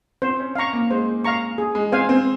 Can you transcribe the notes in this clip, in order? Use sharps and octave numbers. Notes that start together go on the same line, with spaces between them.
C4 C5
C#4
F5 A#5 C#6
A#3
G#3 C5
F5 A#5 C#6
G#4
G#3
C4 C5 F5 G#5
C4